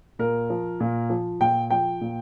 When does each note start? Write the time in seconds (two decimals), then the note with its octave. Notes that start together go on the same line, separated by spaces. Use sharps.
0.19 A#2 A#4
0.50 F3
0.80 A#2
1.10 F3
1.41 A#2 G5
1.70 F3 G5
2.01 A#2